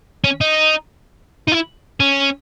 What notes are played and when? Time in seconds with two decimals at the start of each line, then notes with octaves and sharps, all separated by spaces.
0.24 C#4
0.41 D#4
1.48 D#4
1.52 E4
2.00 C#4